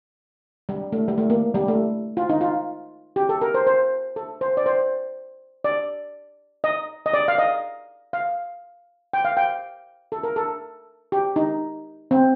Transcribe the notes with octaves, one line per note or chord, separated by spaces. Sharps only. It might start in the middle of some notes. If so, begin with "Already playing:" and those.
G3
A3
G3
A3
A#3
G3
A3
F4
D#4
F4
G4
A4
A#4
C5
C5
A4
C5
D5
C5
D5
D#5
D#5
D5
F5
D#5
F5
G5
F5
G5
A4
A#4
A4
G4
D#4
C4